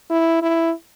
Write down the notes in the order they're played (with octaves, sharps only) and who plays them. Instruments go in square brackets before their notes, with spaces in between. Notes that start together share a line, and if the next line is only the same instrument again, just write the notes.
[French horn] E4
E4